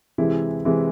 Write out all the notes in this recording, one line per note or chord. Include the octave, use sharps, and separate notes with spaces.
C3 E3 G#3 E4
C3 E3 G#3